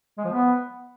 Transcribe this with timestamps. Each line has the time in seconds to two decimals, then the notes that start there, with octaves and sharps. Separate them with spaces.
0.18 G#3
0.25 F3
0.32 B3